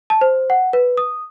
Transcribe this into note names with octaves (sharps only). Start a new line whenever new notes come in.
A5
C5
F#5
B4
D#6